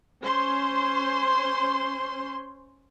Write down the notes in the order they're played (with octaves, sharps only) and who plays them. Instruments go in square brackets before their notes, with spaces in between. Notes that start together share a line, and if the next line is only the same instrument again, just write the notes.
[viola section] C#4 C5 C6